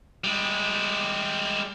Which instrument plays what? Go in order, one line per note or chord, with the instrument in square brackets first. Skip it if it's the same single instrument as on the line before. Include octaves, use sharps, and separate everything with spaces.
[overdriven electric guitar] G3 G#3